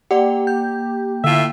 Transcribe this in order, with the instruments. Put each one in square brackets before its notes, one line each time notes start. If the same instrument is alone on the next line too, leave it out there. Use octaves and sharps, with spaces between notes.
[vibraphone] A#3 G5 [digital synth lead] G4 [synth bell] D5 F#5
[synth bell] G6
[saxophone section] A2 F4 E5 [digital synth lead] D3